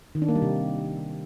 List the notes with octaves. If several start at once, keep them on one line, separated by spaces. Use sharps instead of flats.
D#3
D4
A#3
G3
C3